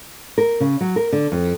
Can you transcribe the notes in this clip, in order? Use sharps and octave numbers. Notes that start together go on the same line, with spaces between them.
A#4
C#3
F#3
A#4
D3
F2